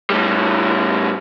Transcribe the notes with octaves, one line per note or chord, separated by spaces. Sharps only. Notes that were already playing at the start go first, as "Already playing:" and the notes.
A2 G3